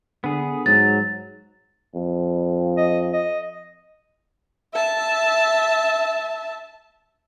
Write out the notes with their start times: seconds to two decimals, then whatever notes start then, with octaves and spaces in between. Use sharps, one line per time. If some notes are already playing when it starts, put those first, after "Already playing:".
0.24 D3 B3 G#4
0.66 G#2 F#3 A6
1.95 F2
2.77 D#5
3.13 D#5
4.73 E5 A5